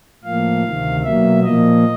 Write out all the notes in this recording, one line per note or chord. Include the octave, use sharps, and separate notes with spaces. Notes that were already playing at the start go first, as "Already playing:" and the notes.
A2 F3 A#3 F5
D2 C3 D#3
B2 F#3 A#3 E5
A#2 F3 A#3 D#5